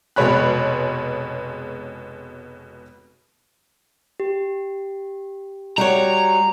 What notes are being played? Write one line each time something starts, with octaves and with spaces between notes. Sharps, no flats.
F1 B2 G#3 C#5 B5 F#6
G4
G3 F#4 C#5 A#5